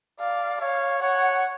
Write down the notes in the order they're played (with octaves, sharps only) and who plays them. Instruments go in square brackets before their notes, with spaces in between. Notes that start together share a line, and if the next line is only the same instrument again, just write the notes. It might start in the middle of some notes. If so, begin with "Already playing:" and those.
[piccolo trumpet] D5 [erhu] F5
[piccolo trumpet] C#5 [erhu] F5
[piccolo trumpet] C#5 [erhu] F#5